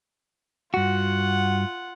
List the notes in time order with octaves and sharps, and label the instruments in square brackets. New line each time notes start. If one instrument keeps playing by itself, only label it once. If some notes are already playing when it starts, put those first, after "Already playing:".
[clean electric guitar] G2 F#4 [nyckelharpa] F4 F#5